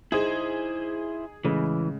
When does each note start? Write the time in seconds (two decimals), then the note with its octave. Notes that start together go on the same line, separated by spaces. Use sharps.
0.12 D#4 E4 G#4 C5
1.45 A2 C#3 E3 G#3